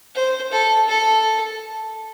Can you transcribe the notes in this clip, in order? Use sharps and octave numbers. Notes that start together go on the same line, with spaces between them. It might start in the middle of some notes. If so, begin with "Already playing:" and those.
C5
A4
A4